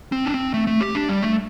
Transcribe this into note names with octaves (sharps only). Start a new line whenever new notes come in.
C4
D4
C4
A3
A3
G4
D4
G3
A3